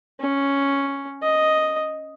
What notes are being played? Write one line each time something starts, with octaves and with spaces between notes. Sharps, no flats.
C#4
D#5